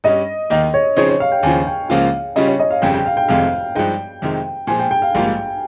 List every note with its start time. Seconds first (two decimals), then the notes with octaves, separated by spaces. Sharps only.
0.04 G2 G3 C#4 D#5
0.50 D#2 D#3 A#3 D#5
0.74 C#5
0.96 C#3 F3 C4 D#4 G#4 C#5
1.09 C#5
1.20 F5
1.32 G5
1.43 D#2 C#3 F3 G#5
1.67 G5
1.90 C#2 C#3 F3 A#3 F4 F5
2.36 C#3 G3 C#4 F4 D#5
2.48 C#5
2.60 D#5
2.71 F5
2.82 G1 F2 C#3 G3 G5
2.94 G5
3.06 F5
3.17 G5
3.28 F1 F2 C3 D#3 G#3 F5
3.75 G2 F3 G#3 D#4 G5
4.22 F2 C3 D#3 G#3 D#4
4.67 A#2 F3 G#3 G#5
4.80 G5
4.91 G5
5.02 F5
5.15 A#1 G#2 G3 A#3 F4